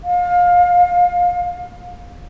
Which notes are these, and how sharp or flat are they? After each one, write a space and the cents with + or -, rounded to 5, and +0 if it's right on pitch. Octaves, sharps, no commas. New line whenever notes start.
F5 +25